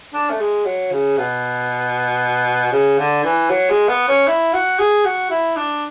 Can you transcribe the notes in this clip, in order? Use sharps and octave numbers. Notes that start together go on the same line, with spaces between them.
D4
A3
G#3
F#3
C#3
B2
C#3
D3
E3
F#3
G#3
B3
C#4
E4
F#4
G#4
F#4
E4
D4